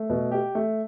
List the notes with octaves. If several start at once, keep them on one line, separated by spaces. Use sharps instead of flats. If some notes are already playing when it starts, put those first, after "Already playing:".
Already playing: A3
B2
G4
A3